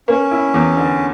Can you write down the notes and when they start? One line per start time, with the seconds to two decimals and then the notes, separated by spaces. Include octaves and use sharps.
0.08 A#3 C#4
0.31 E4
0.54 E2
0.77 D3